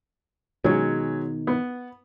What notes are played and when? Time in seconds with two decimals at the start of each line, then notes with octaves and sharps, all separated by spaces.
0.64 B2 D#3 F#3 G#3 C#4
1.47 B3